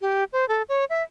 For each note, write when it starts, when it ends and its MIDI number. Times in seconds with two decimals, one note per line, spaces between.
0.01 0.24 67
0.33 0.47 72
0.48 0.62 69
0.69 0.85 73
0.90 1.03 76